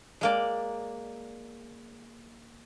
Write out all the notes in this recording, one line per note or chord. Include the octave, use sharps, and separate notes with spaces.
G#3 A#3 D5